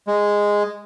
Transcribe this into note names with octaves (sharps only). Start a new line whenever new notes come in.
G#3